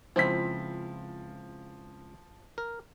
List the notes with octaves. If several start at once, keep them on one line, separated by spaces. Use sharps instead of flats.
C#2 F3 C4 E4 B6
A#4